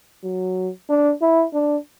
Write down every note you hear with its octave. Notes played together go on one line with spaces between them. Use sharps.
F#3
D4
E4
D4